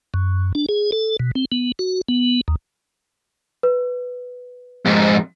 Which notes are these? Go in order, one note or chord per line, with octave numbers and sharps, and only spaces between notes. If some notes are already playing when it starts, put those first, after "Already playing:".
F#2
D4
G#4
A4
B2
C4
B3
F#4
B3
D#2
B4
F2 G#2